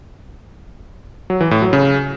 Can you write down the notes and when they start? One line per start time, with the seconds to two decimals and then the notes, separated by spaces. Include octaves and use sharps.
1.30 F#3
1.41 E3
1.51 A2
1.62 F#3
1.73 C#3